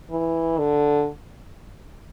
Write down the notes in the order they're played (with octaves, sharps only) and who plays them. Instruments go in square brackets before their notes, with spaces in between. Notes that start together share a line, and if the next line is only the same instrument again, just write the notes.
[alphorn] E3
D3